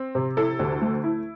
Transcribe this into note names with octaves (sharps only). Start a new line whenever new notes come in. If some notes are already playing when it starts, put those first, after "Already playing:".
Already playing: C4
C3
E4 A4
D2
A3
E4